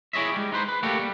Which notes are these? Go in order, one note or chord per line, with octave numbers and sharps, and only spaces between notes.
E4 G#4 C#5 D#5 E5
G3 G#3
D#4 B4 C5
B4
A3 A#3 F#4 G4 A4
G3